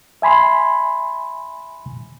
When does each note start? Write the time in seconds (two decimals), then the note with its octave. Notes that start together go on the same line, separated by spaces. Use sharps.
0.22 E5 G#5 B5 C6